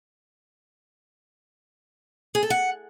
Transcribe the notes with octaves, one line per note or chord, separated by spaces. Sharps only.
G#4
A4
F#5